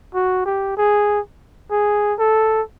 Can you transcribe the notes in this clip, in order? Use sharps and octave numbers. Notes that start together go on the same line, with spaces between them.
F#4
G4
G#4
G#4
A4